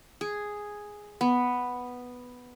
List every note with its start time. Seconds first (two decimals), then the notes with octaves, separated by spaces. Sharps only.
0.21 G#4
1.21 B3